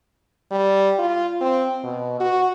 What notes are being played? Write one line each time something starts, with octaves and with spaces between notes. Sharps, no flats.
G3
F4
C4
B2
F#4